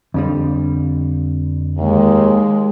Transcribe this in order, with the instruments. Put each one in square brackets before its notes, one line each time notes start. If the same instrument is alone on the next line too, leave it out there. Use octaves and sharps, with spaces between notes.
[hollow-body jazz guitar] F2 D3 G3
[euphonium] D#2 [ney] G#3